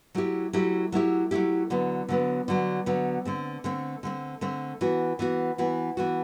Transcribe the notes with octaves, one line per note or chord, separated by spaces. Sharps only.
F#3 A3 E4 G4
F#3 A3 E4 G4
F#3 A3 E4 G4
F#3 A3 E4 G4
D3 F#3 B3
D3 F#3 B3
D3 F#3 B3
D3 F#3 B3
D3 A3 C4
D3 A3 C4
D3 A3 C4
D3 A3 C4
E3 B3 F#4
E3 B3 F#4
E3 B3 F#4
E3 B3 F#4